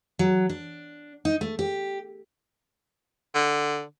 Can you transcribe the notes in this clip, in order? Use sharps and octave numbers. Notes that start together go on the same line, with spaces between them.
F#3
D4
D#4
A3
G4
D3